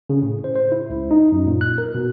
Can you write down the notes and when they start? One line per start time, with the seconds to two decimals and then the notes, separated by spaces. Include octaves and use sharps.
0.10 C#3
0.23 A2
0.44 C5
0.56 C5
0.72 E4
0.90 C#2
1.11 D#4
1.32 F#2
1.47 A#2
1.61 F#6
1.78 A#4
1.95 B2